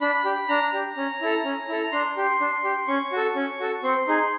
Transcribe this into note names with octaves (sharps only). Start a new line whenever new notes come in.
D4 B5
G4
D4 A#5
G4
C#4
E4 A4
C#4
E4 A4
D4 C6
G4
D4
G4
C#4 C#6
F#4 A4
C#4
F#4 A4
C4 C6
D#4 G#4